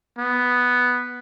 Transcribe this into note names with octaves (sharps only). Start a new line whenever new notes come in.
B3